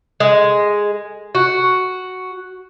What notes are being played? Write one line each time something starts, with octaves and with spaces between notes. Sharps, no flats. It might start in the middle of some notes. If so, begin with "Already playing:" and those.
G#3
F#4